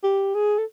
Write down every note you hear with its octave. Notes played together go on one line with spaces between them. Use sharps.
G4
G#4
A4